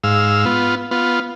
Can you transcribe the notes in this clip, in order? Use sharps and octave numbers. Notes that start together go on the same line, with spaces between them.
G#2 F5 E6
B3 F4
B3 F4